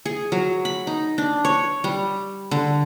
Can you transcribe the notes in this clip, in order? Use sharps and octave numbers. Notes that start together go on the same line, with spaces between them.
G#4
F#3
B5
D#4
D4
C#5
G3
D3